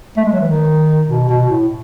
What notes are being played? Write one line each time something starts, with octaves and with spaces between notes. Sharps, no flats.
A3
G#3
F#3
E3
D#3
B2
B2
A2